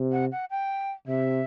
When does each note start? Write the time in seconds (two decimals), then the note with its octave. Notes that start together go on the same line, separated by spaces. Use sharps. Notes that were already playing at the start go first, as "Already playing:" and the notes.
Already playing: C3
0.12 F#5
0.32 F#5
0.50 G5
1.07 C3 E5